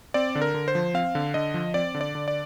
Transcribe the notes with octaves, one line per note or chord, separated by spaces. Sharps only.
C4 D5
D3
A#4
D3
C5
F3
C4 F5
D3
D3 D#5
F3
C4 D5
D3
D5
D3
D5